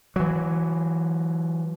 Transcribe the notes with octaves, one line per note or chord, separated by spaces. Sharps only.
E3 F#3